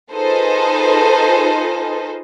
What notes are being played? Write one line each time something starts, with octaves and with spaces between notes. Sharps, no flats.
D#4 F4 G#4 A4 B4 C5